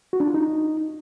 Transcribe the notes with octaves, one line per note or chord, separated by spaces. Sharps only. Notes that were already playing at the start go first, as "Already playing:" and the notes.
F#4
D4
F4
D#4